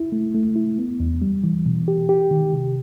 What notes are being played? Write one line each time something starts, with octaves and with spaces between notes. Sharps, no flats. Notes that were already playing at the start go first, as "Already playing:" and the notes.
Already playing: E4
A3
A3
E4
B3
E2
G3
E3
B2
G4
G4
D#3
C3